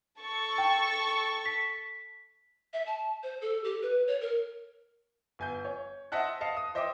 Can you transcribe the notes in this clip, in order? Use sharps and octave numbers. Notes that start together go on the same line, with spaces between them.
A4 A5 C#6
G5
B6
E5
A5
C5
A4
G4
B4
C#5
A#4
G1 G#5 G6
C#5
C5 D#5 E5 F#5 A5 F#6
D#5 F5 A5 C#7
D#6
C5 D#5 E5 G5 D6